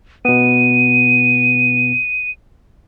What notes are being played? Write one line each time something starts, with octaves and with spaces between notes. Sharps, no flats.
B2 B3 D#7